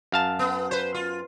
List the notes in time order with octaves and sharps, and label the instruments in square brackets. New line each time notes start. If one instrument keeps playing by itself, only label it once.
[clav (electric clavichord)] F#2 F5 A5
[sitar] B3
B4 C5
F4